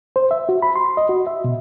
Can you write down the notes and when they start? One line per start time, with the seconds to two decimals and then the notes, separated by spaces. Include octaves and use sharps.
0.16 C5
0.31 E5
0.49 F#4
0.62 B5
0.76 C6
0.97 D#5
1.09 F#4
1.27 E5
1.44 B2